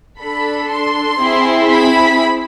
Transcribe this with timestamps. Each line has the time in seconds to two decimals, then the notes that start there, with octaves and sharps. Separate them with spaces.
0.20 D4 A4 B5
0.71 C6
1.21 C4 E4 G#4
1.71 B5